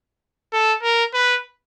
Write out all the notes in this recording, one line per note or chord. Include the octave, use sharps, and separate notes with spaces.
A4
A#4
B4